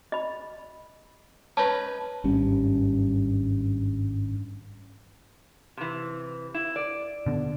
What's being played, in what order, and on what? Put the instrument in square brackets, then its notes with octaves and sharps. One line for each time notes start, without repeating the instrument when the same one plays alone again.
[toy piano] D#5 B5
[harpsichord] C#4 D#4 B4 [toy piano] A5
[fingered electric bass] G#1 G2 G3 C#4
[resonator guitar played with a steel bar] C3 E3
E4
D5
[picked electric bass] B2 D3